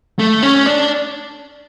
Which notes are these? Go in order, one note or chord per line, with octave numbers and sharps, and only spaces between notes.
A3
C#4
D4